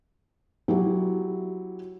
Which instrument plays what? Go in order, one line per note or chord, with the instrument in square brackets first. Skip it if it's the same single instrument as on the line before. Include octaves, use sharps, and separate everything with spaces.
[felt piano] F#3 E4 G4